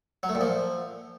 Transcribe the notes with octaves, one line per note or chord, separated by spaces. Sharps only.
F#3
A3
A#2
F3